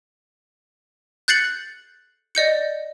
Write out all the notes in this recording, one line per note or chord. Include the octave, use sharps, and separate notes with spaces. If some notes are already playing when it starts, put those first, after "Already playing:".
F#6 G6 A6 C7 C#7 F#7
D5 D#5 G6 C#7